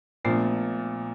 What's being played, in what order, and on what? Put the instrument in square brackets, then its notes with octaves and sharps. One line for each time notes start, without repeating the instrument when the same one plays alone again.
[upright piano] A#1 A#2 F3 [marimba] A3 B3